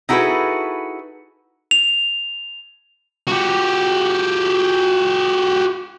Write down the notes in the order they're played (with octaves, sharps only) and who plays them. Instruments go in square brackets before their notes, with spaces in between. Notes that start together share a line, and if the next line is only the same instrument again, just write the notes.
[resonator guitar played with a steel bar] D#4 E4 F#4 G#4 A4 B4
[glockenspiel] F7
[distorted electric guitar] F#4 G4